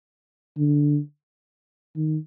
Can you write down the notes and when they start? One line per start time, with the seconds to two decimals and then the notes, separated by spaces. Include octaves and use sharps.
0.57 D3
1.96 D#3